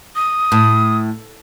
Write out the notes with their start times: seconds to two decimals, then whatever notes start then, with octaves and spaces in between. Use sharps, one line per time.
0.16 D#6
0.52 A2